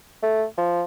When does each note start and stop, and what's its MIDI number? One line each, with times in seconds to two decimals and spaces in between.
0.23 0.44 57
0.58 0.83 53